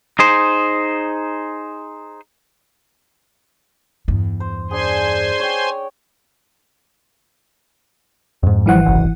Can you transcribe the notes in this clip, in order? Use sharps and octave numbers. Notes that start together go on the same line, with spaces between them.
D#4 G#4 C5
E2 G2
C5
D4 G#4 C5 G#5 C6
C#5 G5
F2 G#2
G#1 E3 F3 G3 F#5
F#1 C2